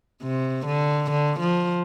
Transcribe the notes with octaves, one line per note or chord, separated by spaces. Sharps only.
C3
D3
D3
F3